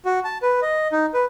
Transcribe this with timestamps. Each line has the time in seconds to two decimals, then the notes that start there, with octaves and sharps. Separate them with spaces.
0.05 F#4
0.24 A5
0.42 B4
0.62 D#5
0.92 D#4
1.14 B4